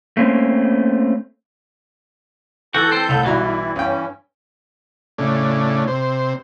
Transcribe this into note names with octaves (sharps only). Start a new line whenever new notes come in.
A3 A#3 C4 C#4
E3 F#4 A4 G6
C4
C2 A2
B1 E3 G3 E4 F#4 A#5
G2 C#4 G5
A2 C#3 D4
C3 C5